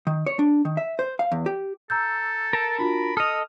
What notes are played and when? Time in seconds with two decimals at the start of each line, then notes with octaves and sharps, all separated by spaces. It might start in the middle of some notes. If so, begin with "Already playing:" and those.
0.07 D#3
0.27 C#5
0.39 D4
0.65 D#3
0.77 E5
0.99 C5
1.19 F5
1.32 E2
1.46 G4
1.90 A4 A#5 E6 G6
2.53 A#4 A5
2.79 D4 F4 F#4 B5
3.17 A4 D#5 D#6 F6 F7